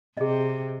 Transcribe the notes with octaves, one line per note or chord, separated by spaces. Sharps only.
C3 G#4 D#5